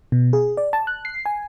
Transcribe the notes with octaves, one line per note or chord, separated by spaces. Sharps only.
B2
G#4
D5
A5
F#6
C7
G#5